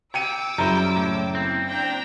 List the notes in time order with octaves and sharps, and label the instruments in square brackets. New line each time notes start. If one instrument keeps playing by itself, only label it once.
[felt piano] G5 C#7 D#7 [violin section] D6 E6
[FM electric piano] F#2 C#3 E4 [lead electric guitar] G3 C5 [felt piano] A#5
[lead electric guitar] A2
[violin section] A#3 [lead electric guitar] C4
[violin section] D4 G5 A#5